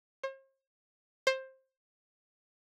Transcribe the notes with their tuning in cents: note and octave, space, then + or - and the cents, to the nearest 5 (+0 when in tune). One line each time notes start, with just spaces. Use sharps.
C5 +45
C5 +15